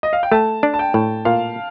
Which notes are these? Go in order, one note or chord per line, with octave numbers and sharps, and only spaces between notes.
D#5
F5
G5
A3 A5
D4
A5
G5
A2
A#2 F5